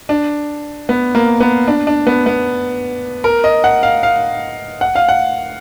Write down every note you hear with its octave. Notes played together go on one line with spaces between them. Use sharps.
D4
B3
A#3
B3
D4
D4
B3
B3
A#4
D#5
F#5
F5
F5
F#5
F5
F#5